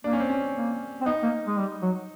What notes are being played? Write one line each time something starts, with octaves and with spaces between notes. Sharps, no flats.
A#3 D4
C#4
C4
C#4
A#3
C4
B3 D#4
A#3
G#3
G3
F#3